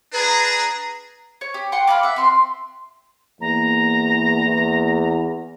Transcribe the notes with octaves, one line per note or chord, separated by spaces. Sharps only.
D4 G#4 B4 A#5
C#5
G4
F#5 G5 C6 C#6
A#4 F5 B5 D6
E5 F#5
C4 C6
E2 A#3 A#5
E2